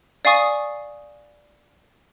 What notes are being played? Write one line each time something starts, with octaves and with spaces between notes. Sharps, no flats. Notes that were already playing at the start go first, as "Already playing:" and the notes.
D5 F5 G#5 C#6 D#6